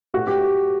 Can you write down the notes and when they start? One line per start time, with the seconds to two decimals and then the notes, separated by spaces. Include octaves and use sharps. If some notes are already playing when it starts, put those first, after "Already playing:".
0.14 A2 F#4
0.27 G4